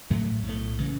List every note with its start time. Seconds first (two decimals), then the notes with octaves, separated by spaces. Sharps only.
0.10 A1 A2 F#3 A3
0.46 B1 A2 F#3 A3
0.80 C#3 E3